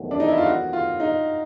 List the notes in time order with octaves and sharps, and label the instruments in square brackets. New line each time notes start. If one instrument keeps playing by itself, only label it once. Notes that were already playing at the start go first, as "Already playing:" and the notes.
Already playing: [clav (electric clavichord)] E2 C3 D#3 F#3 A3
[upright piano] D4
D#4
E4
F4
F#4
F4
D#4